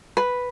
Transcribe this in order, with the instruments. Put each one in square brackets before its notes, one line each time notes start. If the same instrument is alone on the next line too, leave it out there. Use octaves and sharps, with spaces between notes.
[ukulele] B4